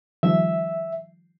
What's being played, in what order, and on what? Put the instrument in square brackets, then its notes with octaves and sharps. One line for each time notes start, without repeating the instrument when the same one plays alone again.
[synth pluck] D#3 F3 G3 [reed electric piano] E5